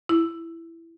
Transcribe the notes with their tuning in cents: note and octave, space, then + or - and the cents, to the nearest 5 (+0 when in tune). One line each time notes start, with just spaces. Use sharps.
E4 +10